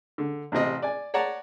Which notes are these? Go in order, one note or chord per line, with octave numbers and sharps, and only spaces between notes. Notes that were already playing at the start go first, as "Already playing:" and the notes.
D3
A1 C3 C4 D#5
D5 G#5
C#5 D5 F#5 A5 A#5